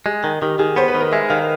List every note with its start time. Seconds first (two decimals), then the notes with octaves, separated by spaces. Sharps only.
0.06 G#3 G#4
0.24 D#3
0.41 D#3 G4
0.59 D#3 G#4
0.76 B3 C5
0.88 B4
0.95 D#3
1.00 A#4
1.12 G#3 E5
1.30 D#3 F5